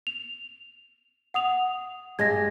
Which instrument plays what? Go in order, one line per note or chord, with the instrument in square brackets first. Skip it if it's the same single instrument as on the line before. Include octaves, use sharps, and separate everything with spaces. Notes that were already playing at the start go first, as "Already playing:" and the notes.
[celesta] F7
F#5 D#6 F7
[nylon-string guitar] G2 G#3 [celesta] G#6 A#6